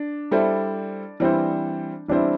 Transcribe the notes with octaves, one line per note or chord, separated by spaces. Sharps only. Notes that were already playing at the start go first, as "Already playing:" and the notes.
Already playing: D4
G3 E4 A4 C5
E3 G3 C4 D4 E4 C5
E3 G3 C4 D4 E4 C5